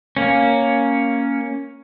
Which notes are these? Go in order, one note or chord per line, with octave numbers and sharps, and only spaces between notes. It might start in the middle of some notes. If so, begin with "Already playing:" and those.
A#3 C#4